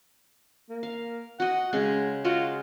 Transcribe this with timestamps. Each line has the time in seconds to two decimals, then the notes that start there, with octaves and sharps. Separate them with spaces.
0.69 A#3
0.83 F5
1.40 F#4 D#5 F#5
1.73 C#3 G#3 C#4 C6
2.25 G#3 F4 F#4 D#5